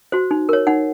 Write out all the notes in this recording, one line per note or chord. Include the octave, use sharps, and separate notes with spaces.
F#4 C5
D#4
A#4 C#5
D#4 F#5